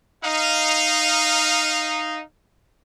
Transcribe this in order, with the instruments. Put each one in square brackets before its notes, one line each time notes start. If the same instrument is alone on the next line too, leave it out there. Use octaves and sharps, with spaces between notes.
[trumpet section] D#4 F5